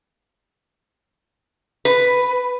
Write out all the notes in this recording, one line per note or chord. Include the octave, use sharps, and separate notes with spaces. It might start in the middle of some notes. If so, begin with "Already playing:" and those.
B4